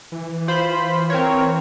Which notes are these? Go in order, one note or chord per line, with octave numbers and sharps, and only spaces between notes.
E3
F4 C5 B5
C4 A#4 C#5